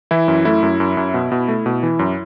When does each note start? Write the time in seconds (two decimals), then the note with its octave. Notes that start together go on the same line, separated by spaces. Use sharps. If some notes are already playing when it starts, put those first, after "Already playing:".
0.11 E3 E4
0.28 F#2
0.45 A3 E4
0.63 F#2
0.80 F#2
0.97 F#2
1.14 B2
1.32 B2
1.48 A3
1.66 B2
1.83 E3
1.99 F#2